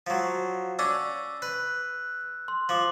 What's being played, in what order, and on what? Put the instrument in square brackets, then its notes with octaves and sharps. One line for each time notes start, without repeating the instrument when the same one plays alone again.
[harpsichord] F3 F#3
[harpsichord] C#4 D4 [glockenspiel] E6
[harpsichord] B4 [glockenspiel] F#6
[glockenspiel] C6
[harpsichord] F3 [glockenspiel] D6 F#7